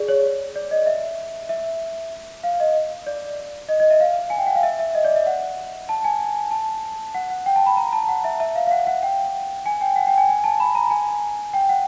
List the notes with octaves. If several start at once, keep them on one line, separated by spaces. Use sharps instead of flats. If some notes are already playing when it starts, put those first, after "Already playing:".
Already playing: G#4 D5
C#5
D5
D#5
E5
E5
F5
D#5
D5
D#5
D#5
E5
F5
G#5
G5
F#5
F5
E5
E5
D#5
D5
E5
F#5
A5
G#5
A5
F#5
F#5
G5
A5
B5
A#5
A5
F#5
E5
E5
F5
F5
F#5
F#5
G5
G#5
G5
F#5
G5
G#5
G#5
A5
B5
A#5
G#5
G5
F#5